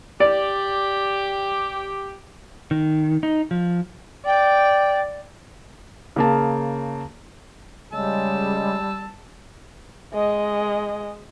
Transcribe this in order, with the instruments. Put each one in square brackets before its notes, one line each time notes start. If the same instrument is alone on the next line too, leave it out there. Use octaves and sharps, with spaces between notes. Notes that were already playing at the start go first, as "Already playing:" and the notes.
[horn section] G4 [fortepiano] D5
[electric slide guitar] D#3
D#4
F3
[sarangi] D5 [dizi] G5
[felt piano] C#3 A#3 A5
[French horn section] C#3 G#3 [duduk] G3 [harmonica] A5 E6
[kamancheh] G#3 D#5